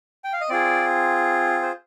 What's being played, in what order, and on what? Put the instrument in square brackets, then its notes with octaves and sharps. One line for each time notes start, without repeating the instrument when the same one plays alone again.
[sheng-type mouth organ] G5
F5
D#5
C4 F4 G#4 D5
C5